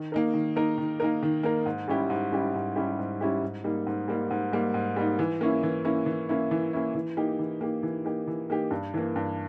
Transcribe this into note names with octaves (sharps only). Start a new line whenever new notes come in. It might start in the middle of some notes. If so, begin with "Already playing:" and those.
Already playing: D#3
A#3 D#4 A#4
D#3
A#3 D#4 A#4
D#3
A#3 D#4 A#4
D#3
A#3 D#4 A#4
G#2
G3 C#4 E4 G4
G#2
G3 C#4 E4 G4
G#2
G3 C#4 E4 G4
G#2
G3 C#4 E4 G4
G#2
G3 A#3 D#4
G#2
G3 A#3 D#4
G#2
G3 A#3 D#4
G#2
G3 A#3 D#4
E3
A#3 C#4 E4
E3
A#3 C#4 E4
E3
A#3 C#4 E4
E3
A#3 C#4 E4
E3
A#3 D#4 G4
E3
A#3 D#4 G4
E3
A#3 D#4 G4
E3
A#3 D#4 G4
G2
E3 A#3
G2